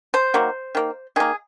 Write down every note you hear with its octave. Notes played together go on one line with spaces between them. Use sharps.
C5
D#3 F#3 A#3
D#3 A#3
D#3 A#3 G#4